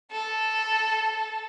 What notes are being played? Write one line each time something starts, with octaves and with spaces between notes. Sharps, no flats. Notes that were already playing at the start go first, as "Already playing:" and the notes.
A4